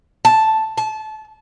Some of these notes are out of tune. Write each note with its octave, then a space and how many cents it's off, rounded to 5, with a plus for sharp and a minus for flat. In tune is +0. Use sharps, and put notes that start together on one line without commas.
A5 +0
A5 -25